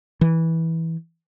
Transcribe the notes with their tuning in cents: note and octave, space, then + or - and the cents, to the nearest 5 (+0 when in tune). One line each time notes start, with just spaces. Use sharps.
E3 -15